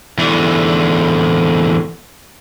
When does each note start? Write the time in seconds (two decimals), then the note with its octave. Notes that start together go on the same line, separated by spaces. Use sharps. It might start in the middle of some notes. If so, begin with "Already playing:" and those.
0.18 E2 D3